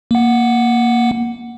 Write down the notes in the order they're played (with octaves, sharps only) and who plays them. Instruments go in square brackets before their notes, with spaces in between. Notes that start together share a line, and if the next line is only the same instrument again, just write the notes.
[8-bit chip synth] A#3 F#5